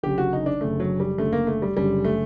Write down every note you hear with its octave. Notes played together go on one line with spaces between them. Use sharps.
F#1 F#2 D3 G4
F#4
D#4
D4
F#1 F#2 D3 A3
F#3
G3
F#1 F#2 D3 A3
A#3
A3
G3
F#1 F#2 D3 G3
A3